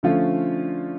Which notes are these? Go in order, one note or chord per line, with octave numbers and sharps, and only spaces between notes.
D3 F3 A3 C#4 F4